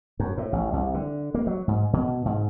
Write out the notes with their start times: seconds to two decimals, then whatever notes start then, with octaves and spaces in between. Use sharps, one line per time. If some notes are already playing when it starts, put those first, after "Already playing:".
0.20 F#2
0.38 A2
0.53 A1
0.73 C2
0.94 D3
1.34 A#3
1.47 F#3
1.68 G#2
1.93 B2
2.26 G#2